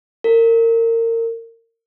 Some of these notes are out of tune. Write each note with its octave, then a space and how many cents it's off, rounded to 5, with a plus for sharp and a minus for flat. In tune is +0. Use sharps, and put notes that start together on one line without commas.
A#4 -30